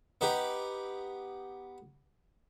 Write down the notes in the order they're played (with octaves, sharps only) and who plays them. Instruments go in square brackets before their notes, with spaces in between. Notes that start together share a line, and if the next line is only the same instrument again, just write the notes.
[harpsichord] B3 D#4 G4